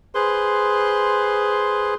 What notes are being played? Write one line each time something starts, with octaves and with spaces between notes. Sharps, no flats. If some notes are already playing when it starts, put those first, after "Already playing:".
G#4 B4 C5 C6